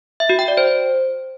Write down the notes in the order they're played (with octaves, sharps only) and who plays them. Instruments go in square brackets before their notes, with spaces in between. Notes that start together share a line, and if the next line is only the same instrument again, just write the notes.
[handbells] E5
F#4
G5
D5
C5